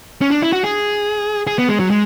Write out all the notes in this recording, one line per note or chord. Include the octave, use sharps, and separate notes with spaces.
C#4
D4
E4
F#4
G#4
G#4
B3
G#3
F#3
G#3